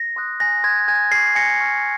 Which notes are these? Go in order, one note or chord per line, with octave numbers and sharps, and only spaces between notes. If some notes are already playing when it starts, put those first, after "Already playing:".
Already playing: A#6
C6 D#6 F#6
G#5 A#6
C6 D#6 F#6 G#6
G#5 G#6
C#6 F6 G#6 C7
G#5 A#6 C#7
C#6 F6